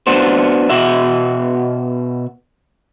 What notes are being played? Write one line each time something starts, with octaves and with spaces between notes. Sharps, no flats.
B3 D4 F#4 C5
B2 F#4 E5